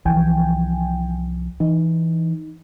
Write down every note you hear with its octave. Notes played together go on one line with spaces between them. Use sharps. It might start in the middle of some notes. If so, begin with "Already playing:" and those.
C2 E3 F3 G5 G#5
E3 D#4